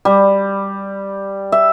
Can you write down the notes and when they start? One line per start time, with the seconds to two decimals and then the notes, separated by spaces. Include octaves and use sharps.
0.05 G3
1.52 E5